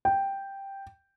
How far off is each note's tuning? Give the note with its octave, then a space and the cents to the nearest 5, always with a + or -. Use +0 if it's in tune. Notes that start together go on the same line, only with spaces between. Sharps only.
G5 +0